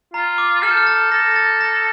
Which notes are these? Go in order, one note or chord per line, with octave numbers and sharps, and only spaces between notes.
F4 A#5
D6
A4 F6
G6
F6
A6
A4 A#6
A#6
A6
A#6